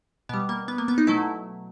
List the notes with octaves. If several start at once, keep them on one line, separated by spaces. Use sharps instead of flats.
B2 G3 B3
A#3
B3
A#3
B3
D#4
B2 F#3 A3 E4